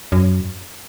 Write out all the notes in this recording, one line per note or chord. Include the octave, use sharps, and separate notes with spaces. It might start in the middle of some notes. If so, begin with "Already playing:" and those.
F#2